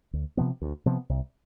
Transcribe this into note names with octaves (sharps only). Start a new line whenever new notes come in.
D2
C3 F3 B3
D2
C3 F3 B3
C2